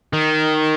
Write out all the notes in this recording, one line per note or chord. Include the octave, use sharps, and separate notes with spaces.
D#3